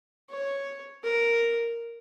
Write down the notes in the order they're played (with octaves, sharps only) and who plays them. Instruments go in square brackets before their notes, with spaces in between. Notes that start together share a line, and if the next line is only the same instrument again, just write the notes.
[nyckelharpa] C#5
A#4